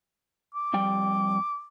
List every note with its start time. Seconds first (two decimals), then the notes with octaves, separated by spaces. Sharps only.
0.55 D6
0.74 F2 G3 G5